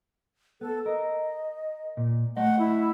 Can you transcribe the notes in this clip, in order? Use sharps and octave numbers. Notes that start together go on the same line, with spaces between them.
B3 A4
A#4 D#5
A#2
A3 D#5 F#5
E4